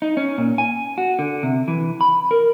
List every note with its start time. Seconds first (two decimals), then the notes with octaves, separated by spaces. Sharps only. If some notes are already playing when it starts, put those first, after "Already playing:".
0.02 D#4
0.17 C#4
0.38 A#2
0.58 G#5
0.98 F#4
1.19 D3
1.43 C3
1.68 E3
2.01 B5
2.31 A#4